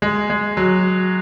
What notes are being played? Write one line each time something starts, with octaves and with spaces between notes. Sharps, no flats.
G#3
G#3
F#3